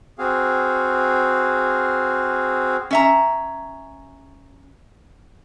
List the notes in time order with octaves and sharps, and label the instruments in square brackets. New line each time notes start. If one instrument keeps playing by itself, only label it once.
[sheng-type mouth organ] C4 F#4 G#4 F5
[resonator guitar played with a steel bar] C#4 E5 A#5